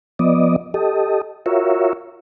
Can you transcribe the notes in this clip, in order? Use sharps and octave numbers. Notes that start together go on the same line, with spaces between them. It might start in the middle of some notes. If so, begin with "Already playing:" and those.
F3 B3 D5 D#5
G4 A4 D#5
F4 F#4 A#4 C#5 E5